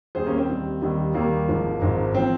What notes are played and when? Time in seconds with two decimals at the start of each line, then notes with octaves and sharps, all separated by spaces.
0.15 D#2 D#3 G3 G#4 C5
0.26 A#3 C#4
0.38 C4
0.49 D#2 D#3 G3
0.82 D#2 D#3 G3
1.14 D#2 D#3 G3 A#3
1.48 G#1 G#2 F3
1.81 G#1 G#2 F3
2.15 F3 C4